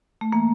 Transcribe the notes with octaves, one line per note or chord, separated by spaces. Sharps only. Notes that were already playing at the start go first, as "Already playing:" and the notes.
A3
E3 A#3